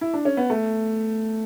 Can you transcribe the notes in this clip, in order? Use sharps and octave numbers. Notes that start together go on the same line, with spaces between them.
E4
D4
C#4
B3
A3